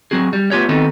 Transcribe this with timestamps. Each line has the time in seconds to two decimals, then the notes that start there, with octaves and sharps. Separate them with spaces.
0.11 F#3 C4 F#4 G#4
0.33 G3
0.52 A3 B3 D4 F4 G4 C#5
0.69 D#3 B3 C4 D#4 F#4 A4